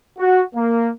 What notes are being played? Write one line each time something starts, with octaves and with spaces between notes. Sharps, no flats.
F#4
A#3